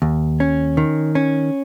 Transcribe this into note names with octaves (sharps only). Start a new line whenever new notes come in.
D#2
C#4
D#3
C#4